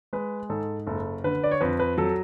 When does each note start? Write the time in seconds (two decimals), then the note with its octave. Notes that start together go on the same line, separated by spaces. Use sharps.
0.13 G#3 B4
0.50 G#2 A4
0.87 F#1 A4
1.24 D3 B4
1.43 D5
1.51 C#5
1.61 F2 B4
1.79 B4
1.98 F#3 A4